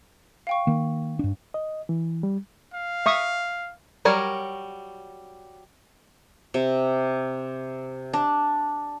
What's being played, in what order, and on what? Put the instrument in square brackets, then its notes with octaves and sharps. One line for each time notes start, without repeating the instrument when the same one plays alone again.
[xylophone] F5 G5 C#6
[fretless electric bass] D#3 A#3
G2 D4
[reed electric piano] D#5
E3
G3
[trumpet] F5
[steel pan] E5 C#6 D#6
[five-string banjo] F#3 G3 A#4 C#5
[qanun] C3
D4